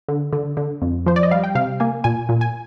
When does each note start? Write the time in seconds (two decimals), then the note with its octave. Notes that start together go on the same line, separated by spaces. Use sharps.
0.08 D3
0.33 D3
0.57 D3
0.82 F2
1.06 F3 C5
1.16 D5
1.23 D#5
1.31 G3 F5
1.43 G5
1.55 C3 F5
1.80 A#3 G#5
2.04 A#2 G#5
2.29 A#2
2.41 G#5